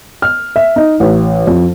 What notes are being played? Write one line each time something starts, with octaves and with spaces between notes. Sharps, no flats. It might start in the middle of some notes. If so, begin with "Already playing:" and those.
F6
E5
D#4
A1
F2